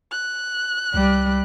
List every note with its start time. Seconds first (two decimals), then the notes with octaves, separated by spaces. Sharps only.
0.11 F#6
0.94 C2 G3